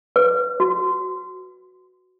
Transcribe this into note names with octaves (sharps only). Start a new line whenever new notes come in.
B4
F#4